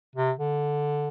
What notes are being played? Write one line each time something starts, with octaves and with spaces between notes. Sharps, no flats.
C3
D3